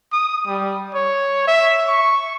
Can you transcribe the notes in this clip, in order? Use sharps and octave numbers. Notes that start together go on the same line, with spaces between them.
D#6
G3
C#5
E5
C#6